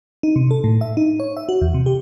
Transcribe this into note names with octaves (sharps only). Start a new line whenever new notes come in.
D#4
C3
A4
A2
E5
D#4
C#5
E5
F#4
E2
C3
G4